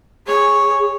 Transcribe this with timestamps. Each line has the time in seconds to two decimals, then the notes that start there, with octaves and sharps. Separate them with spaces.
0.28 G#4 C#5